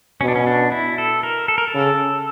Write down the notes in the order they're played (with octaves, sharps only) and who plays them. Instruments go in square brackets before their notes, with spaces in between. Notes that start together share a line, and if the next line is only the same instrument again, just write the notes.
[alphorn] B2 [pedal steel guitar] C#4
[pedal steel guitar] D4
C#4
D4
E4
A4
A#4
A4
A#4
A4
[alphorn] C#3